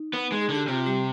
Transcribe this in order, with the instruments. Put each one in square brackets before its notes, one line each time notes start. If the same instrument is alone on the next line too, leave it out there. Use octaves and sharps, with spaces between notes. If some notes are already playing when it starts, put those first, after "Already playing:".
Already playing: [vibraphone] D#4
[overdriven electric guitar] B3
G#3
[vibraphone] G#4
[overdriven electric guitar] D3
[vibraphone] G4
[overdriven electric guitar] C3 [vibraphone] F4
[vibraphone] G3 G4